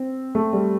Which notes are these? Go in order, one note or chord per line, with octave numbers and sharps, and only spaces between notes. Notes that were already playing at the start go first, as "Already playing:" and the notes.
Already playing: C4
A3
G3